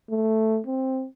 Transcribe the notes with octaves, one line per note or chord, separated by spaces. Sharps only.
A3
C4